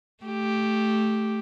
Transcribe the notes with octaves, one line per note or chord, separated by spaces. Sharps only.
A3 G4